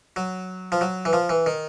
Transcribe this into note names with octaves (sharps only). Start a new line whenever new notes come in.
F#3
F3
F#3
E3
F3
E3
D#3